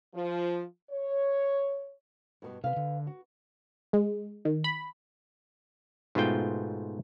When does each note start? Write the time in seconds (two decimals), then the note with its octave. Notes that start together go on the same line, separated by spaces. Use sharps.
0.13 F3
0.90 C#5
2.42 G2 B2 B3
2.64 C3 B4 F5
2.76 D3
3.07 F#4
3.93 G#3
4.45 D#3
4.64 B5
6.15 G#2 B2 A3 F4 G5